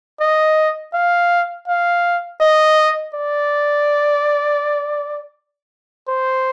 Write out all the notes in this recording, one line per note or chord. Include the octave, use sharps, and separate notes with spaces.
D#5
F5
F5
D#5
D5
C5